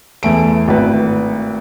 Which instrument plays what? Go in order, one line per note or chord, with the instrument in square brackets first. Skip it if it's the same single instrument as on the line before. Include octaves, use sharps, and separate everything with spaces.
[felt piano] E2 A3 D7
G#1 A2 B4